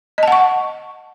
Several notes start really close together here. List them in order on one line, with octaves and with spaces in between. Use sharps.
D#5 A5 F#5 C#6